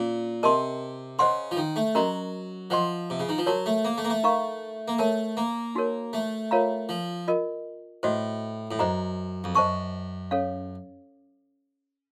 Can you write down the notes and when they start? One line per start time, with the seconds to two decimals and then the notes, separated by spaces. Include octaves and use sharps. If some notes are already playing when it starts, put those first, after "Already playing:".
Already playing: A#2 C#4
0.43 C3 A#4 D#5 A5 C6
1.19 C#3 C5 D#5 F#5 C6
1.51 F3
1.57 D#3
1.76 A3
1.95 F#3 C#4 F#4 A#4 D#5 A#5
2.70 F3 C5 D#5 F#5 C6
3.10 C3
3.20 C#3
3.29 D#3
3.38 F3
3.46 F#3 F#4 A#4 C#5 A5
3.66 A3
3.85 A#3
3.98 A3
4.05 A#3
4.10 A3
4.23 D#4 A#4 F5 A#5 C#6
4.88 A#3
4.99 A3 A#4 C#5 A5
5.37 A#3
5.75 D#4 F#4 A#4 C#5
6.13 A3
6.51 F4 A#4 C#5 F5 A#5
6.89 F3
7.28 F4 A#4 D#5
8.03 A2 F#4 C5 D#5
8.71 A2
8.79 F#2 C5 D#5 F#5 A#5
9.44 F2
9.55 F#2 C5 D#5 A5 C#6
10.31 C#4 A4 C#5 F5